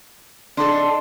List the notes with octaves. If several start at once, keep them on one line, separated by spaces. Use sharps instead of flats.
D4 D#4 A4 C6